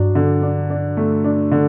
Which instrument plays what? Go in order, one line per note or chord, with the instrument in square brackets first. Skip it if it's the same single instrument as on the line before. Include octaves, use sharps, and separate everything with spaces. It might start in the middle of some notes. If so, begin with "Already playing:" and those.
Already playing: [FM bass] G2 [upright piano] F#3 D4
[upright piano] D3
D4
D4
A3
D4
D3